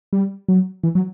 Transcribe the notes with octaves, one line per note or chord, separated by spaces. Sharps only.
G3
F#3
E3
F#3